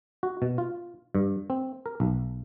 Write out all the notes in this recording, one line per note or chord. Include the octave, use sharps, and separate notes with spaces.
F#4
B2
F4
G2
C4
A#4
B1